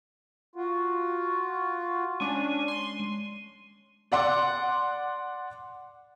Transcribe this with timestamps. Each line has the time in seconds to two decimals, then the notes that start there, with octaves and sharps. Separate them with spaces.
0.56 F4 F#4
2.20 G#3 C#4 D4
2.68 C6
4.12 D5 F#5 C6 D6